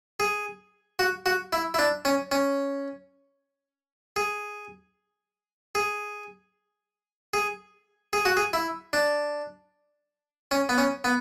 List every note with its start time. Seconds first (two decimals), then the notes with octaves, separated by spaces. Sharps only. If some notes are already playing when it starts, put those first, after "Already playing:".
0.20 G#4
0.99 F#4
1.26 F#4
1.53 E4
1.74 E4
1.79 D4
2.05 C#4
2.32 C#4
4.16 G#4
5.75 G#4
7.34 G#4
8.13 G#4
8.25 F#4
8.37 G#4
8.53 E4
8.93 D4
10.51 C#4
10.69 B3
10.78 C#4
11.04 B3